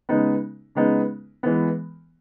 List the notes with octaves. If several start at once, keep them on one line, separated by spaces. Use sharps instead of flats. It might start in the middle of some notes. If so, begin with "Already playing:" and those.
C#3 G#3 B3 D#4
C#3 G#3 B3 D#4
E3 G#3 B3